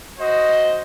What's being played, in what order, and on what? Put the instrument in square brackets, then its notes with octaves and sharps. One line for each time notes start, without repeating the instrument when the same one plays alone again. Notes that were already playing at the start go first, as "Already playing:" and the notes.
[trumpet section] F#4 C5 D#5